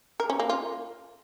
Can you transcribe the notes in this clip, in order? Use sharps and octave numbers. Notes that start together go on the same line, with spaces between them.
A#4
C#4
A#3
F4